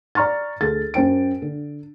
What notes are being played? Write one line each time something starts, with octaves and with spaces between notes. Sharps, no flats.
D5 A#5 C#6 F6 A6
D2 G#4 A4 A6
F#2 C5 G5 D7
D3